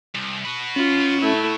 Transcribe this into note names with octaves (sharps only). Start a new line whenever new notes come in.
C2
F#4 B4
C#4 F4
A3 E4